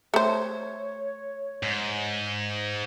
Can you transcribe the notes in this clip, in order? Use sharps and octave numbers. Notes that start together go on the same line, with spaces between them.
A3 C5 C#5
G#2